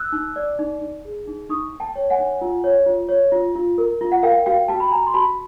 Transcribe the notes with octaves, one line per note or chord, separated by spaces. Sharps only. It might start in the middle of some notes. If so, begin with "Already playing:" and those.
Already playing: E6 F#6
D#4
D5
D#4
D#4
G#4
D#4
D#4 C#6 D#6
D#4
G5 A5
C#5
F#5 G#5
D#4
F4
C#5
F4
C#5
F4
F4
A#4
F4
F#5
A#4 F5 G5
F#4 F5 G5
F#4 G5 A5
B5
F#4 G#5 A#5
C6
F#4 A5 B5